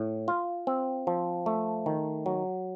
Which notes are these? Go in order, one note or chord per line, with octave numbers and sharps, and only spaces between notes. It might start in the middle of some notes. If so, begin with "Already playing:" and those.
Already playing: A2
F4
C4
F3
A3
D#3
F#3